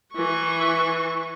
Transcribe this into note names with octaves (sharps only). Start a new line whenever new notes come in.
E3 C#6